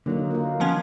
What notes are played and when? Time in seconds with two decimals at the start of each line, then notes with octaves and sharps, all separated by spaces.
0.06 D3 F#3 A#3 D#4
0.31 A#3 F4
0.60 F3 B3 C#4